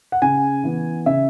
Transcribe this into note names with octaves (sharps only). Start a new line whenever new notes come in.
F#5
C#3 G#5
E3 B3
C#3 E5